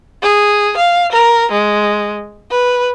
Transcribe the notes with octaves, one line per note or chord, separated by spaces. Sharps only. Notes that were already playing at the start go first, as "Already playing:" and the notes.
G#4
F5
A#4
G#3
B4